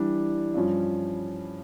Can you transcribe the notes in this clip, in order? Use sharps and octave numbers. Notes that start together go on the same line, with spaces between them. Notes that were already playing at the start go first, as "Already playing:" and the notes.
Already playing: E3 G3 D4
G2 F3 C#4